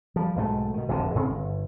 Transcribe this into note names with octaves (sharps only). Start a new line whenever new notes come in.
F3 G3
B1 G#2 A3
B2 D#3
F1 A#1 F2 D3
G#2 C#3 C4
G1